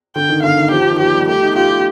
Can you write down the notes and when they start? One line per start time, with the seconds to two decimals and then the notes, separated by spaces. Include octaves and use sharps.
0.16 D3 G5
0.29 D#3
0.43 D3 F5
0.57 D#3
0.71 F3 G4
0.82 F3
0.91 D#3
0.99 F3 G4
1.14 G3
1.28 A3 G4
1.42 D#4
1.55 F4 G4
1.69 F4